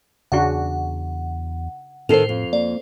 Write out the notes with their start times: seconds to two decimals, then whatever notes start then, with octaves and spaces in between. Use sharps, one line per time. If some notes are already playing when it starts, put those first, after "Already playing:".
0.32 E2 C#3 D4 F#4 F#5
2.09 A2 D#3 A4 C5 C7 F7
2.29 F2
2.53 A#3 D5